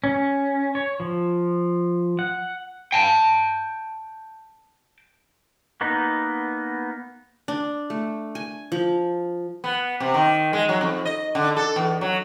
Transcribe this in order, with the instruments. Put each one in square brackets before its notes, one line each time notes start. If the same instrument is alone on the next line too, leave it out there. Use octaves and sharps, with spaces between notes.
[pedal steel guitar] C#4
C#5
F3
F#5
[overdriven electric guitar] G5 A5
[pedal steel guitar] A#3 B3 D#4
[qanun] D4
A3
G#5
F3
[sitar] B3
C3
D#3
G#3
F#3
F2
D#5
D3
A4
E2
F#3